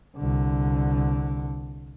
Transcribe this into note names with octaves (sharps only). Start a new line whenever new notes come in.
C2 D3